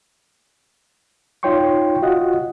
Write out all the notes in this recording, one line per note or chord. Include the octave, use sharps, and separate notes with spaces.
D#4 F4 C#5 G5 C6 C#6
F4 F#4 D#5 F#5